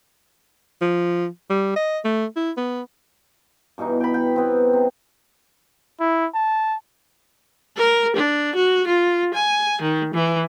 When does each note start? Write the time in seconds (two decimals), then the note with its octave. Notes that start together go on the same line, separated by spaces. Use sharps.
0.82 F3
1.50 G3
1.76 D#5
2.05 A3
2.36 E4
2.58 B3
3.78 G2 B2 E3 D#4
4.00 G5 B5
4.14 G5
4.36 B3 C4
4.73 C3
6.00 E4
6.34 A5
7.77 A#4
8.16 D4
8.55 F#4
8.87 F4
9.34 G#5
9.81 D#3
10.13 E3